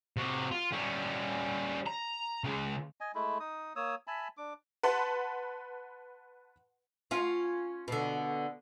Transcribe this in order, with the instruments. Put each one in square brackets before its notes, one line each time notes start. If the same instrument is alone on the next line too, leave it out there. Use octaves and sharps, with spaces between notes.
[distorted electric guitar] C3 F#4
F4
G3 C#4
A#5
C#3 G#3
[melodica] D#5 G#5
G#3 A3 E4
D#4 D#6
A#3 C#5 D#6 E6
E5 G#5 A5 B5
D4 D6
[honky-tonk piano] B4 F#5 A5 C6
[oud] C#4 F4
B2 D3